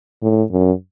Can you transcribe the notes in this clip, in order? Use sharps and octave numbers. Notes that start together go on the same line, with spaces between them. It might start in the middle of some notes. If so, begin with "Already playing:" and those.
A2
F#2